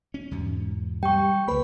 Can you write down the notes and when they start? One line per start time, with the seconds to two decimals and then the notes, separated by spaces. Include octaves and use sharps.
0.14 C#4
0.31 E2 G#2 B2
1.03 G3 G5 C#6
1.48 C#2 A#3 B4 B5